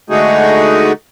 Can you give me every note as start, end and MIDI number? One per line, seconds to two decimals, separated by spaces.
0.10 0.92 50
0.10 0.92 56
0.10 0.92 57
0.10 0.92 63
0.10 0.92 66
0.10 0.92 68